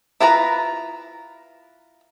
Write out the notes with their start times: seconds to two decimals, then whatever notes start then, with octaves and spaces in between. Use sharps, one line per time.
0.20 E4 F4 B4 A5 A#5